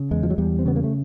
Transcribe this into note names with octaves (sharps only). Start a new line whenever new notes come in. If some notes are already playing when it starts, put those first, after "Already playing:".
Already playing: C#3
E2 G#3
F3
F#3
E2 G3
C4
C#3 B3
A#3
A3